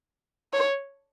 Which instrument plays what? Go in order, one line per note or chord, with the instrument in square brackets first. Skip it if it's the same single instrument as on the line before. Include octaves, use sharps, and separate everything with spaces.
[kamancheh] C#5